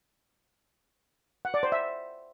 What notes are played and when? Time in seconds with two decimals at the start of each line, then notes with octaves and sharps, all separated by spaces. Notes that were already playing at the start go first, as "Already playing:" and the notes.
1.45 F#5
1.54 D5
1.63 C5
1.72 E5